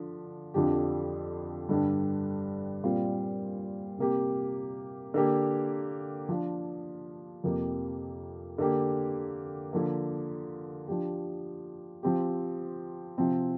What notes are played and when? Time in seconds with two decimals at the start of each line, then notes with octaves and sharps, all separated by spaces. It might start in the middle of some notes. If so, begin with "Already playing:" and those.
Already playing: D3 F3 D4
0.54 F2 D3 F3 D4 G4
1.69 G2 D3 G3 D4
2.84 A#2 G3 C4 F4
3.99 C3 A#3 G4
5.14 D3 A#3 G4
6.29 F3 D4 F4
7.44 F2 C3 A#3 G4
8.58 D3 A#3 G4
9.73 D3 F3 A#3
10.88 F3 D4 G4
12.03 F3 C4 G4
13.18 C3 F3 C4